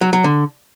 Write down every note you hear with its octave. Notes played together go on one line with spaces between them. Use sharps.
F#3
F#3
D3